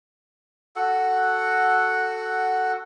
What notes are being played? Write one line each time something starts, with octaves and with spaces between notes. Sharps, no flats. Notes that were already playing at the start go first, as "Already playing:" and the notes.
F#4 A4 F#5